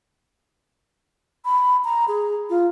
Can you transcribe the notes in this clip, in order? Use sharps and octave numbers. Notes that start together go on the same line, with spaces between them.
B5
A#5
G#4
F4